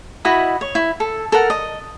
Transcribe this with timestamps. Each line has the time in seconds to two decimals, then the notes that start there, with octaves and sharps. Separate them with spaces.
0.25 E4 F#4 D#5 B5
0.61 C#5
0.75 E4
1.00 A4
1.32 A4 A#4 F#5
1.50 D#5